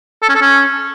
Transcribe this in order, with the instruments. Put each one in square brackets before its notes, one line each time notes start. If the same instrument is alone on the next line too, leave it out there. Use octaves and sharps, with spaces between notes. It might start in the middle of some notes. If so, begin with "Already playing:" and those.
[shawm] A4
C#4
A4
C#4